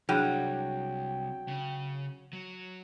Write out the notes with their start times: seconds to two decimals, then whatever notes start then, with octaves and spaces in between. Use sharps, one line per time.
0.09 C2 F#3 D4 E4 G#4 G5
1.48 C#3
2.33 F#3